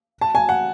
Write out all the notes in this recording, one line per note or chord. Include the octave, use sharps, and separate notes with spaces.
A5
G#5
F#5